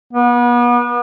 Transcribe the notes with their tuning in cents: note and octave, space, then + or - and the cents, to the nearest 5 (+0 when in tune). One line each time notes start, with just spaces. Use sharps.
B3 -35